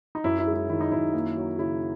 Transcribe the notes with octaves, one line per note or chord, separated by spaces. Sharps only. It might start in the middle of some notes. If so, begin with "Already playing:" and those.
D#4
F#2 E4
E4
G#3
E4
D#3 E4
D#4
F#2 E4
A#3
F#3
C#3 E4